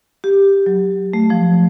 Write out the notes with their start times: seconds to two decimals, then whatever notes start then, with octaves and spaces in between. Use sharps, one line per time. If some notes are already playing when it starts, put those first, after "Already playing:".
0.24 G4
0.66 F#3
1.13 A3
1.30 F3